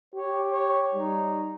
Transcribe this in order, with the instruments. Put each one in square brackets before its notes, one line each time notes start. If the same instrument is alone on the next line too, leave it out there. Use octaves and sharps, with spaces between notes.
[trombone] G4 [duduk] C#5
[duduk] C#5
[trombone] G3 [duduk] D#4